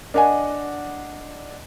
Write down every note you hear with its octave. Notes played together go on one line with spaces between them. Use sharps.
D4 A#4 C#5 D#5 F#5 G#5